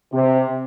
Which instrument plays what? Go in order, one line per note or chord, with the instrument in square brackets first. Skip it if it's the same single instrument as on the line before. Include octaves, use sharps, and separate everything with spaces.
[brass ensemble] C3